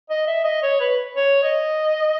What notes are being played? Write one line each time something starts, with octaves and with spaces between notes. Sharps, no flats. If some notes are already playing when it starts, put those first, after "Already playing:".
D#5
E5
D#5
C#5
B4
C#5
D#5